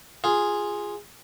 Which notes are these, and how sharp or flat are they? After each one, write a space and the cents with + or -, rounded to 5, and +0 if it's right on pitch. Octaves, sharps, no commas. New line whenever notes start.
F4 +0 G#4 -5